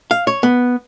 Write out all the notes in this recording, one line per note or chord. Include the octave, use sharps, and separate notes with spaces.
F5
C#5
B3